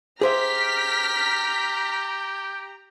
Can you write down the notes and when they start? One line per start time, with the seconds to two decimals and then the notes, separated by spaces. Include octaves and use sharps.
0.21 G4 G#4 C5 E5 A#5 F6 B6